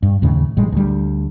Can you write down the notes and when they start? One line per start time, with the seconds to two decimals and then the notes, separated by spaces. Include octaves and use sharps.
0.03 G2
0.22 D#2 A2 C#3
0.57 A1 A2 G3 G#3
0.72 D2 G3